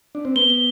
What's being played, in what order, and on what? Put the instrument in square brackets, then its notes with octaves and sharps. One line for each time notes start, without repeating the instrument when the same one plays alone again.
[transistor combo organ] D4
C4
[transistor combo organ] B3 [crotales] G7
[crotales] G7